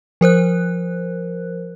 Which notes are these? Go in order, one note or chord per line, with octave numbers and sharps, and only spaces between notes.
F3 A#4 C5 F#6